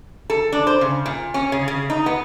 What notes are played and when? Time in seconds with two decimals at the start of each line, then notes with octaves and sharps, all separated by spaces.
0.30 A4
0.52 D4
0.67 C5
0.81 C#3
1.06 A#2
1.34 C#4
1.52 C#3
1.68 C#3
1.90 D#4
2.06 B3